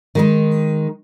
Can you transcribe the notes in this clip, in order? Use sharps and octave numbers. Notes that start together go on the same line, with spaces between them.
D#3 G#3 D#4